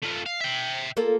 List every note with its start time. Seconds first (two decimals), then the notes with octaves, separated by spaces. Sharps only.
0.03 A3 F4
0.26 F5
0.41 E5 G5
0.97 A#3 F4 A4